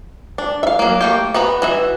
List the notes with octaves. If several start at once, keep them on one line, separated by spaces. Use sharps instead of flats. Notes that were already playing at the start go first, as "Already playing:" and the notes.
D4
E5 F5
F#3 A#3
A3 A#3 G4
B3 F#4 A#5 B5
E3 F#4 E5